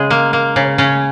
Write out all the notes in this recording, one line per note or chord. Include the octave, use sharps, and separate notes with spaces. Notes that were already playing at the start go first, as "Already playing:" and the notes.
Already playing: C#3 G#3
A#3
A#3
C#3
C#3 C#4